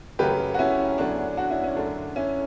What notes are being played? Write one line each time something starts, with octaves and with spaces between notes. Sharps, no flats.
F#2 C#3 F#3 A3 G4 B4
F#4
C#4 E4
E2 D3 F#3 A3 D4
D4 F#4
C#4 E4
C#4
F#2 D3 A3 D4
C#4 E4